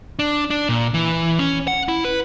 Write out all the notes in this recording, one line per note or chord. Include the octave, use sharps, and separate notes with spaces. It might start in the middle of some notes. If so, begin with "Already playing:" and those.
D4
D4
A#2
E3
C#4
F#5
E4
B4